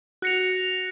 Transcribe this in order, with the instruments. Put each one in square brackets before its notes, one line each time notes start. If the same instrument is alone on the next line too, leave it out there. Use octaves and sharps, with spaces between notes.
[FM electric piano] F#4 [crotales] F#6 A#6 C#7 F7